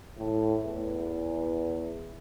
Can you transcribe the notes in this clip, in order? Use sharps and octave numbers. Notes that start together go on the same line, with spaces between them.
A2
E2